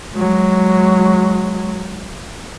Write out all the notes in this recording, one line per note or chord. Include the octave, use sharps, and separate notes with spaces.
F#3 G#3